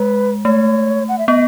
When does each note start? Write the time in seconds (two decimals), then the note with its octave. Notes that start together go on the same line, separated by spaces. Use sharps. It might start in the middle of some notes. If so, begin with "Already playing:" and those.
Already playing: G#3 B4
0.45 A3 C#5
1.09 F#5
1.18 E5
1.28 B3 D#5